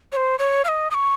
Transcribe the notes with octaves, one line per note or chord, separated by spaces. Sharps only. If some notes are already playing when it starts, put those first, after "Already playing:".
C#5
C5
C#5
F5
D#5
D#6
C#6